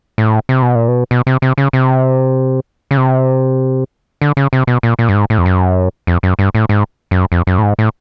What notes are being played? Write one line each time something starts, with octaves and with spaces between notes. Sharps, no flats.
A2
C3
B2
A#2
B2
B2
C3
C3
C#3
C3
C#3
C3
D3
C#3
C3
B2
A#2
A#2
G2
G#2
A2
F2
F#2
F2
F#2
G2
A2
G#2
F#2
F2
F#2
A2
G#2
A2